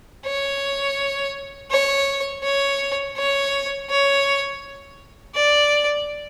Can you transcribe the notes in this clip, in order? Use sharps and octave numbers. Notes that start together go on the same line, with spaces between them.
C#5
C#5
C#5
C#5
C#5
D5